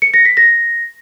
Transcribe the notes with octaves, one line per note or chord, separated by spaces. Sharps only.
C#7
A#6
B6
A#6